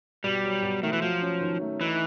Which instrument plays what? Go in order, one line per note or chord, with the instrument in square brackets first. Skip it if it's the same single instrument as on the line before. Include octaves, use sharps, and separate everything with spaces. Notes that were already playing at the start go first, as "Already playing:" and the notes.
[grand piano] B2 [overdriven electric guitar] G3
[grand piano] F#3
B2
[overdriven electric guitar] D#3 [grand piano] A3
[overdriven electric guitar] E3
[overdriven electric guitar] F3 [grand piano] F#3
[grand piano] C#4
D#3
A3
[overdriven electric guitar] E3 [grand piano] D#4